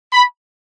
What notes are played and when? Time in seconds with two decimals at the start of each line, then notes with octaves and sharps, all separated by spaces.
0.13 B5